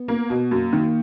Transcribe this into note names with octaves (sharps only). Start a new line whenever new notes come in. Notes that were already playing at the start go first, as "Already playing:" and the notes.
Already playing: B3
A#3
B2
F#2 A#3
D#3